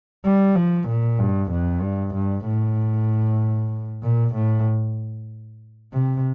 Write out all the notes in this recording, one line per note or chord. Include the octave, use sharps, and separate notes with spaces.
G3
F3
A#2
G2
F2
G2
G2
A2
A#2
A2
C3